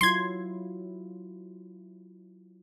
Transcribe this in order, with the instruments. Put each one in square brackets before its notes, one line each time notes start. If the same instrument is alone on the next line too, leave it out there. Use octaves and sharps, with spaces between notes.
[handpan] F#3 E4 F4 [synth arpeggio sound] C6 G#6